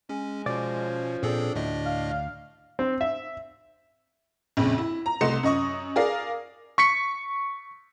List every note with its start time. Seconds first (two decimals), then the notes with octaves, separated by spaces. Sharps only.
0.09 G#3 C#4
0.46 B2 F3 C#4 D5
1.23 A#2 C4 D4 G#4 A4
1.56 D2 A2 A3 D#5
1.85 F5
2.79 C4
3.01 E5
4.57 A#1 F2 C#3
4.78 E4
5.06 A#5
5.21 C2 A3 D#5 C6 C#7
5.43 F#2 D#5 C#6 D#6
5.96 G#4 A#4 D5 F5
6.78 C#6 B6 C#7